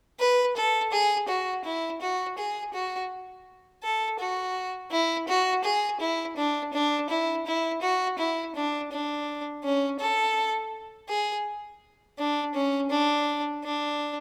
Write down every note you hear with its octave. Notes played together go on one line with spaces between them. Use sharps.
B4
A4
G#4
F#4
E4
F#4
G#4
F#4
A4
F#4
E4
F#4
G#4
E4
D4
D4
E4
E4
F#4
E4
D4
D4
C#4
A4
G#4
D4
C#4
D4
D4